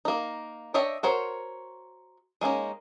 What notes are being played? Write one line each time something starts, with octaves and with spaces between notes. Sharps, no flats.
A#3 D#4
D4 C#5 D#5 E5 G5
F#4 A#4 C5 C#5
G#3 A#3 C#4 D#4